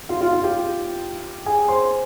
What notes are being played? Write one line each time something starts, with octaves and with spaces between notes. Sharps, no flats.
F4 F5
F4 F5
F4 F5
G4 G5
G#4 G#5
C5 C6